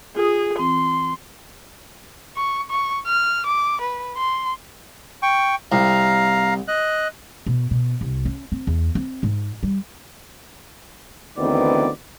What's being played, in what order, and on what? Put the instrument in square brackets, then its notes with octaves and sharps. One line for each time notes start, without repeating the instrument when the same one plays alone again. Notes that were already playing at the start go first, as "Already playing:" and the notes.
[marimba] F4 D#6 [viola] G#4
[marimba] E3 C4 [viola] C6
[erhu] C#6
C#6
F6
D6
B4
C6
[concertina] G5 C#6
[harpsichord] C2 [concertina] F5 A#5
[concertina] D#5 F#6
[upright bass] B2
B2
C2
C#4
C4
E2
C4
G#2
G3
[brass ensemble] D2 D#3 E3 B3 C4 D5